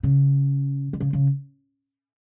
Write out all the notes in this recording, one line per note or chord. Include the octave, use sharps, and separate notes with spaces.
C#3
D3
C#3
C#3